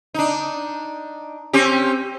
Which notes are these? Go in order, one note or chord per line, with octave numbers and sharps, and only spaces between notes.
D4 D#4
C4 C#4 G4